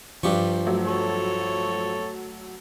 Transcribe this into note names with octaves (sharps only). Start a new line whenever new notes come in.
G2 F3 G4 C#6
F#3 A3
A4 C#5